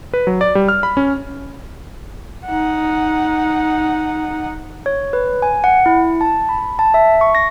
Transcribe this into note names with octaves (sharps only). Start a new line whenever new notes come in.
B4
F#3
D5
G3
F6
B5
C#4
D#4 F#5
C#5
B4
G#5
F#5
E4
A5
B5
A5
E5
C#6
A#6